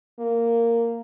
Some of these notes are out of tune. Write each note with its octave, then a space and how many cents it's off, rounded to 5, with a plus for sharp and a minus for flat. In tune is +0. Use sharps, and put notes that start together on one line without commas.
A#3 -10